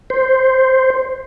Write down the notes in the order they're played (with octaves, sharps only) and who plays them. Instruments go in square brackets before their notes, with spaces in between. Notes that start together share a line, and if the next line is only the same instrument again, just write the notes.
[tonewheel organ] C5